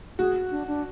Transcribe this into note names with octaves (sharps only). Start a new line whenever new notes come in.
F#4 G#4
D4
D4